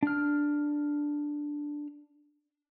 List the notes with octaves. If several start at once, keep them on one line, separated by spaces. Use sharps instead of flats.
D4 F6